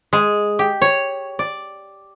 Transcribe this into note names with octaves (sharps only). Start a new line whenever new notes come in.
G#3
G4
C#5
D5